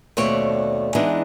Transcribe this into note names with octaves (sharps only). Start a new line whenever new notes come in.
D#2 B2 A3 C4 C#5 D5
E3 G#3 B3 D4 D#4